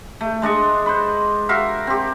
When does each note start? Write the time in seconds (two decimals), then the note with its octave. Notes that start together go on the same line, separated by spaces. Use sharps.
0.21 A3
0.42 G#3 D4 D#5 C#6
0.86 B4 C5
1.49 F#4 A#4 E5 F5
1.87 C4 G4